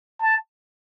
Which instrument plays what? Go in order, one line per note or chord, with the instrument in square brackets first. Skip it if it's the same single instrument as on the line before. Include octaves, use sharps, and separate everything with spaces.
[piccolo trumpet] A5